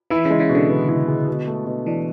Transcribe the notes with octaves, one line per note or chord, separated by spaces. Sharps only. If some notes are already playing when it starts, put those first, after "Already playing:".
E3 E4
C#3
G#3
C#3
B2
D3
B3
E4
G#3
B2
A3
B2
E3 D4